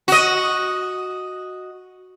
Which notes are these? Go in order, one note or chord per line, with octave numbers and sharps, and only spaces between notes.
F#4 D#5